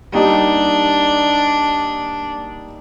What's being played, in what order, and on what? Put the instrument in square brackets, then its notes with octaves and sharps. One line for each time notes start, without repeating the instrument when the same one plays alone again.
[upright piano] G3 A#3 D#4 G4 [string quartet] D4